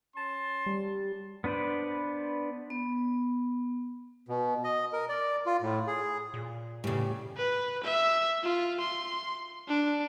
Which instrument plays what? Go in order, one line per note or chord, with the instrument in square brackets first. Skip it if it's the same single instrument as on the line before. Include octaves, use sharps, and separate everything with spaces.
[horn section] C#4 A5 C6
[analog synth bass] G3
[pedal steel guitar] B3 D4 B4 C5 D5
[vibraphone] B3
[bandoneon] B2
D#5
A#4
D5
F4
A2
G#4
[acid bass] A#2
[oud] E2 C#3 [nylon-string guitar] A2 [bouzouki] G3
[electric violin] B4
E5
F4
C6
D4